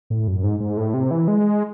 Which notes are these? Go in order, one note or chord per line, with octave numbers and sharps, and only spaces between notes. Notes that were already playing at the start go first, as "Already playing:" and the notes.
A2
F#2
G#2
G#2
A2
C3
E3
G#3